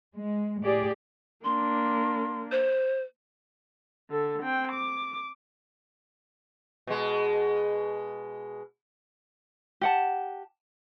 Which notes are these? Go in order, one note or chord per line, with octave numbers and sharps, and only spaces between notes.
G#3
A2 G4 G#4 D5
A#3 D4 C6
C5
D3 A4
C4 G5
D6
B2 G#3
G4 F#5 A5